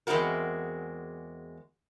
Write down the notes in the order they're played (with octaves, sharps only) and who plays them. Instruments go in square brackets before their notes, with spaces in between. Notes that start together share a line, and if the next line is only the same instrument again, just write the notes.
[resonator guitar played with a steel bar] E2 G#3 C4 E4 F#4 A#4